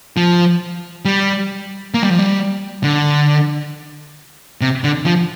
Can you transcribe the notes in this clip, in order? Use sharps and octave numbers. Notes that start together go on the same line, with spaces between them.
F3
G3
A#3
G3
F3
G3
D3
C3
D3
F3